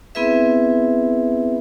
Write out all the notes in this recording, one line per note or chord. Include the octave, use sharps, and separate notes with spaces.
B3 C4 E4 G#4 B4 E5